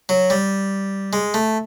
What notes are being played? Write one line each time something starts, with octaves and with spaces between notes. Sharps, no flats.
F#3
G3
G#3
A3